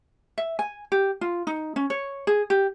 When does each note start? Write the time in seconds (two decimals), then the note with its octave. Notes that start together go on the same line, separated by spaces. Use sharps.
0.38 E5
0.59 G#5
0.92 G4
1.21 F4
1.47 D#4
1.76 C#4
1.90 C#5
2.27 G#4
2.50 G4